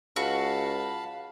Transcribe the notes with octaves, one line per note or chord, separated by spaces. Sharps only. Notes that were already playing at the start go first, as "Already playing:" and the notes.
C#2 F#4 F5 A5 B5